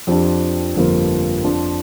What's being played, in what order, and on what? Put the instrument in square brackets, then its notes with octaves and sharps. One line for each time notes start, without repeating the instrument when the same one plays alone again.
[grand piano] F2 F3 D4 G4
G1 F2 F3 A#3
F2 F3 D4 F4